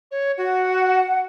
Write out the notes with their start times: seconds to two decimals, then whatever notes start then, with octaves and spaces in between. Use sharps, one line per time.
0.11 C#5
0.38 F#4 F#5